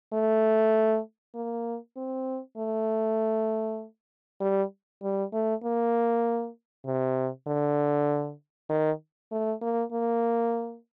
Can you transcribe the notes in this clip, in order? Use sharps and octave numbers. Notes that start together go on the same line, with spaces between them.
A3
A#3
C4
A3
G3
G3
A3
A#3
C3
D3
D#3
A3
A#3
A#3